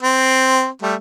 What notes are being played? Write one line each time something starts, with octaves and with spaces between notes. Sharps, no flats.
C4
G3 A3